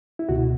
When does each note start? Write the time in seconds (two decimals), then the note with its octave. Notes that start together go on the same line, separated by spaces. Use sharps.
0.19 E4
0.29 C#2 B2 F#4